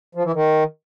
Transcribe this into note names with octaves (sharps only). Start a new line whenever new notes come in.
F3
E3
D#3